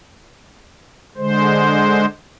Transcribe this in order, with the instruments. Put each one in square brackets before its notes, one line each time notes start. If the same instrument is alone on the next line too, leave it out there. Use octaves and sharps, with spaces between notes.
[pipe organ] D3 G#3 C5